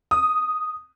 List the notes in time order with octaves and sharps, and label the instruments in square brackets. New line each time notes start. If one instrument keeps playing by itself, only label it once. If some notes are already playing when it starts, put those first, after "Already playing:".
[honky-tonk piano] D#6